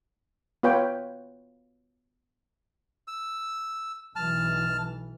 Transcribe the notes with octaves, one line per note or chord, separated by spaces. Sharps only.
B3 F4 B4 C#5 G5
E6
B1 E3 A5 F6